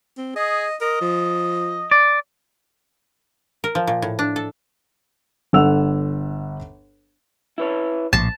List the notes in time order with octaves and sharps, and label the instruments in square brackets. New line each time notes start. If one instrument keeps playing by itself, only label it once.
[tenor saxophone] C4
[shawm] G#4 [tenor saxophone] D#5
[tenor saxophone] A#4 [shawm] D#5
[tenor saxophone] F3
[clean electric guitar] D5
[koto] A#4
F3
A#2
A2
D4
A4
[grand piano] G1 A4 F#5 E6 F7
[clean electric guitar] E4 B4 C#5
[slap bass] A#1 A2 [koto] A5